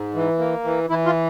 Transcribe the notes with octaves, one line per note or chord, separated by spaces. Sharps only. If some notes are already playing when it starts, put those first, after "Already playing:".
Already playing: G#2
E3
A#3
E3
E3 E4
F4